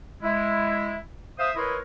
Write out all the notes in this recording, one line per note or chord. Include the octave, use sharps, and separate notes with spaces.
G#3 E4
C5 E5 F5 D#6
E4 A#4 B4 C#5 D#5 C6